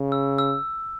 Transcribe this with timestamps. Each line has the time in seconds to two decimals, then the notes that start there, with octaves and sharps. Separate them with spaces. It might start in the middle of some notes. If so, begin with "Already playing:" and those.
Already playing: C#3
0.12 E6
0.38 E6